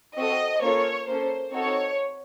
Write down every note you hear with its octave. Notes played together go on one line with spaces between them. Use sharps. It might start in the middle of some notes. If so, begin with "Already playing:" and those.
C4 F#4 A4 D#5
A#3 C#4 F4 A4 C#5
A#3 C#4 A4 C5
C4 D#4 F#4 A4 C#5